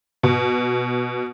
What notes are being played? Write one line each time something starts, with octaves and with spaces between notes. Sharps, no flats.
B2